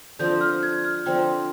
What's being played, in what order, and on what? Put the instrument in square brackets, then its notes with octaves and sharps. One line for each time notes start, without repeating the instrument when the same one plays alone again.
[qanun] D3 F3 C4 [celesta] G6
[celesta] F6
G#6
F6
[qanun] D3 F3 C4 [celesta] G5